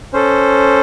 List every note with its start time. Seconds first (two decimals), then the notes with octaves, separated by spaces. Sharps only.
0.13 C#4 A4 C5